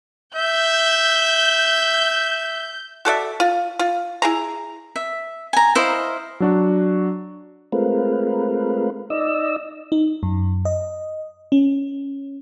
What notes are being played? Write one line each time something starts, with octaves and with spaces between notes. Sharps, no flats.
E5 G6
F#4 A4 D5 E5
F4
F4
E4 G#4 A#5
E5
G#5 A#5
E4 C5 D#5 F5
F#3 D4 F#4
G#3 A3 C4 F4 A#4 B4
D#4 D5 D#5 E6
D#4
F#2
D#5
C#4